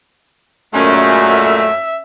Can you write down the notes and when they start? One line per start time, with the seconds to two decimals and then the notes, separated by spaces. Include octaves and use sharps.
0.74 F#2 A#2 G#3 A3 C#4
1.29 E5